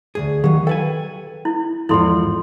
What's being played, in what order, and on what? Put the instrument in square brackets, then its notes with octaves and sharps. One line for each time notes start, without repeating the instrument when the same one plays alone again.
[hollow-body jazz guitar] D2 G2 G#4
[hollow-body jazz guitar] D#3 F#3 [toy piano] G4
[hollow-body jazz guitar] A4 B4 G#5 [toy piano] G5
[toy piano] E4
[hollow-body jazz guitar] E2 G#2 F3 [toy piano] E4 A4 C6